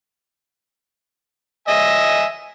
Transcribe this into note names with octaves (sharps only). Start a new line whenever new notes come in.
D#5 E5 G#5